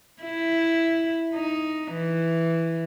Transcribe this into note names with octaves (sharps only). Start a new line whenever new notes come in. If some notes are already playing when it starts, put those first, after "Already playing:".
E4
D#4
E3